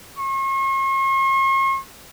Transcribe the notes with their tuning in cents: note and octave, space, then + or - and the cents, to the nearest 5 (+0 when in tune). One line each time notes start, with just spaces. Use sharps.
C#6 -45